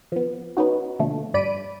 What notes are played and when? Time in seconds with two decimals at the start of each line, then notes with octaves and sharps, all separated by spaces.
0.12 F3 B3
0.57 B3 C#4 D#4 F#4
0.99 B2 D3 F3 A3
1.34 G2 G3 D5 B5 D7 D#7